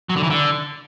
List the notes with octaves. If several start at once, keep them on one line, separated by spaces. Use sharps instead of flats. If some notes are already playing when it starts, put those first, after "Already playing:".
F#3
D3
E3
D3